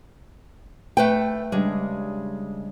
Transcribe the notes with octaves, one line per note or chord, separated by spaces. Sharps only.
A3 B4 G5
C#3 G3 G#3 D4